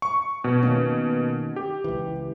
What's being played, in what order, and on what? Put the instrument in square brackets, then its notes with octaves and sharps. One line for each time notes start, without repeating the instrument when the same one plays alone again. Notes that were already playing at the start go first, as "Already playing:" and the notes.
[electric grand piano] C#6
B2
[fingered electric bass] D#3 A#3 C#4
[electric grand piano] G4
[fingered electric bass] C#2 E3